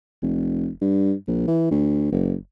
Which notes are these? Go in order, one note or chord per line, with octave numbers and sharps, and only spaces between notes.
F1
G2
A#1
E3
D2
F#1